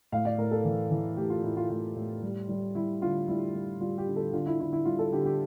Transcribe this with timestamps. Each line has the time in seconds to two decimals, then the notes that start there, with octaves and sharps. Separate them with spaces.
0.12 A2 F5
0.25 D5
0.38 A2 A#4
0.51 A4
0.64 E3
0.91 E3
1.17 A2 G4
1.30 F4
1.43 A2 E4
1.57 F4
1.69 A2 F4
1.96 A2
2.23 G3
2.49 G3
2.75 G3 E4
3.01 D3 F4
3.28 G3 E4
3.54 G3
3.80 G3 F4
3.98 G4
4.07 D3
4.16 A4
4.33 D3 F4
4.46 E4
4.59 D3 E4
4.73 E4
4.85 G3 F4
4.99 A4
5.12 D3 G4
5.25 G4